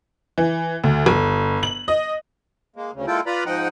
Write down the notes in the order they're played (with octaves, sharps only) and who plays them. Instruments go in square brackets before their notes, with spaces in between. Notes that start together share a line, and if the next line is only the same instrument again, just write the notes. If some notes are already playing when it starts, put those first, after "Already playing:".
[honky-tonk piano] E3
D2
G1
F#7
D#5
[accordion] G#3 A#3
D2 C#3
G#3 A#3 E4 F4 A4 G5
F4 B4 D5 A#5 B5
G#2 F3 D#4 D#5 F#5 G5